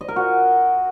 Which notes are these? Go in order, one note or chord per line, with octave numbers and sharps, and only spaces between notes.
D#5
A#4
F#4